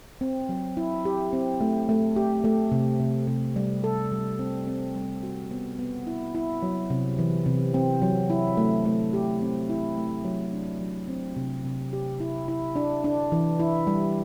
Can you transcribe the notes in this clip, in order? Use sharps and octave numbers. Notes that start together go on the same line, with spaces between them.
C4
F#3
E4
G4
C4
A3
A3
G4
A3
C3
C3
C3
G3
A4
G3
C4
C4
G3
F#4
B3
B3
E4
E4
F#3
C3
E3
C3
C4
F#3
E4
A3
A3
G4
C4
E4
A3
F#3
D4
F#3
C4
C3
C3
G4
E4
E4
D4
D4
E3
E4
G3